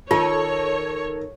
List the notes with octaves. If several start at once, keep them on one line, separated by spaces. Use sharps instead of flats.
D#3 F4 A4 C#5